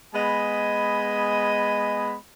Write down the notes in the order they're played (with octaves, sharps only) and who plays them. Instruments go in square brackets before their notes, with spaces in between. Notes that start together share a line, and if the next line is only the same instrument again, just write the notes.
[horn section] G#3 B3 D#5 G#5 B5